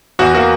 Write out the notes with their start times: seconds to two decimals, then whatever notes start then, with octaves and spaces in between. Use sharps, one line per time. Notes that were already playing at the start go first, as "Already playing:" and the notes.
0.19 E2 F#4
0.35 A#3 F#4